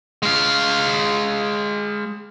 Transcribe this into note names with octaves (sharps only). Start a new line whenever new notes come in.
G#3 F5